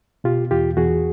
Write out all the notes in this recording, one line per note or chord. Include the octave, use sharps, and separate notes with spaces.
B2 F4 G4
E2 F4 G4
E2 F#4 G#4